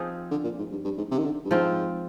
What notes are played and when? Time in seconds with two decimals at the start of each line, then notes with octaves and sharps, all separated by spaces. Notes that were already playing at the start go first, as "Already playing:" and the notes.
Already playing: F3 C4 D#4 G#4
0.31 D3
0.44 A#2
0.58 G#2
0.71 G2
0.85 G2
0.98 G#2
1.11 C3
1.18 D#3
1.25 D3
1.45 G2
1.51 G#2 F3 C4 F4